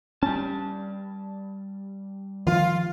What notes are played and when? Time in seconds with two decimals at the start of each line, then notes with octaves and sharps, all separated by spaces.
0.23 G3 C#4 A5
2.47 D#3 F3 F4